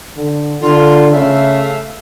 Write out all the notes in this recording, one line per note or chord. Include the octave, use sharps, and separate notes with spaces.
D3
D3 F4
C#3 A3 E5 F5